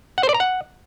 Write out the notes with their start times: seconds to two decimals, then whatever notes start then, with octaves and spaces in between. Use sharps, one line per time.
0.18 F#5
0.23 C5
0.29 D5
0.34 A#5
0.40 F#5